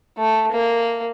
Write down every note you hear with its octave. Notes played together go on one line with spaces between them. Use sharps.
A3
A#3